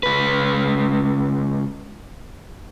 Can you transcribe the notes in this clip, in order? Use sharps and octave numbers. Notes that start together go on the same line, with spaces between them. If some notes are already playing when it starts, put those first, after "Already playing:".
C#2 B4